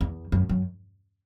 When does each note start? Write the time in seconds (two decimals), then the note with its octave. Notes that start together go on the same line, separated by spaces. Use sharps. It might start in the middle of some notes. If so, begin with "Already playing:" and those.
0.01 E2
0.32 F#2
0.49 F#2